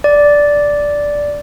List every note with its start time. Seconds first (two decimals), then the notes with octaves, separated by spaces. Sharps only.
0.04 D5